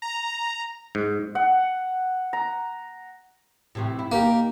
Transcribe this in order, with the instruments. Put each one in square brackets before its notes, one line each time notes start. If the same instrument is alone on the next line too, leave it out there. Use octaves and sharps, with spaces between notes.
[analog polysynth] A#5
[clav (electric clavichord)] G#2
[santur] F#5
A#5
[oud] A2 C3 E3
E4
[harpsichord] A#3 [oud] D#4 G4